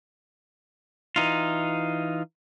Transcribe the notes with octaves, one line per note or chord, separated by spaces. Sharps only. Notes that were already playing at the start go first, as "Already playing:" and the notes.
E3 D#4 F4